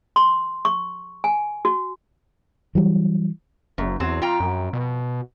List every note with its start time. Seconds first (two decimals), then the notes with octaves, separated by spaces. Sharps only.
0.16 C6
0.65 C#6
1.24 G#5
1.65 F#4
2.75 E3 F#3 G3
3.78 F#1 F#2
4.00 E2 F#3 C4
4.22 F2 F4 G5 A#5
4.40 F#2
4.73 B2